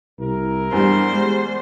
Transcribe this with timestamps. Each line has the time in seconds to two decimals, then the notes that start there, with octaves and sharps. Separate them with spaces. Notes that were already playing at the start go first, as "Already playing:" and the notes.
0.19 C2 E4 A#4
0.73 E2 G2 G3 C5
1.13 G#3